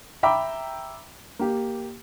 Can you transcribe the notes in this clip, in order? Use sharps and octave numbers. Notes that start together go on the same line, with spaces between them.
E5 G5 A#5 B5 D6 E6
A#3 G4